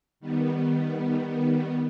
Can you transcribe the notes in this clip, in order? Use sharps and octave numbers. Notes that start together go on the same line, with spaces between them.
D#3 G3 B3